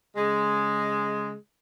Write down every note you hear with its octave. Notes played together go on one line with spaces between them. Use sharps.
C#3 G#3